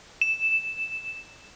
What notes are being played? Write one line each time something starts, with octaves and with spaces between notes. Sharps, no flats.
E7